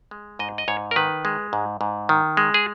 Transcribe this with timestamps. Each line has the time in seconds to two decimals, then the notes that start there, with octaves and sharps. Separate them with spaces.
0.11 G#3
0.39 G#2 D#5
0.58 D#5
0.68 G#2 C#5
0.91 A#4
0.96 D#3 B4
1.25 G#3
1.53 G#2
1.81 G#2
2.09 D#3
2.37 G#3
2.54 G#4